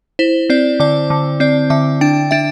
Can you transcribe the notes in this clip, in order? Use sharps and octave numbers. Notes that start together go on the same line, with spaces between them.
E4 C5
C4 D5
D3 D5
D3
C4 D5
D3 E5
D4 G5
D4 E5